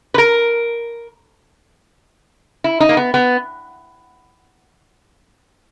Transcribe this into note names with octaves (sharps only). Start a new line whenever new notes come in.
B4
A#4
E4
D#4
A#3
B3
B3